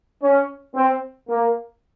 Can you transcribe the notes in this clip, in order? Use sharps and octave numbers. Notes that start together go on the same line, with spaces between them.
C#4
C4
A#3